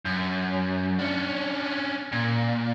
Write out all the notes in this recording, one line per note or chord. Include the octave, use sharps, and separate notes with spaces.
F#2
C#4 D4
A#2